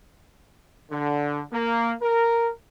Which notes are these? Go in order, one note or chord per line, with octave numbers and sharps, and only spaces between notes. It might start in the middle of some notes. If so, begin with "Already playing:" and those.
D3
A#3
A#4